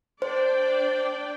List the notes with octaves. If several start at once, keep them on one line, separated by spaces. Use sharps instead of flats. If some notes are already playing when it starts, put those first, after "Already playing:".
D4 C5 D5 G5